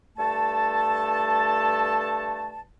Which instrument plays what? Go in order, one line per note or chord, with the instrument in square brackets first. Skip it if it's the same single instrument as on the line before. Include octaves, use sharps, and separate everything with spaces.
[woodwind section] G2 A3 A4 A5